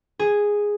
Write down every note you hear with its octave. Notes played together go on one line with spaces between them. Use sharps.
G#4